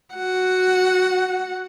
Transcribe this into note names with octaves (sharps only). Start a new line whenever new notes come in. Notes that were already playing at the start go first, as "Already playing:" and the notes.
F#4 F#5